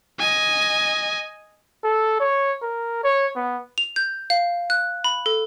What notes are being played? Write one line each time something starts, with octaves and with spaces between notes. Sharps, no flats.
D#5 G#5
A4
C#5
A#4
C#5
B3
F7
G6
F5
F#6
B5
A4